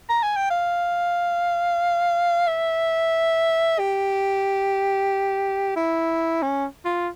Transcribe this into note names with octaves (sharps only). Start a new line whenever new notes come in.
A#5
G#5
G5
F5
E5
G4
E4
C#4
F4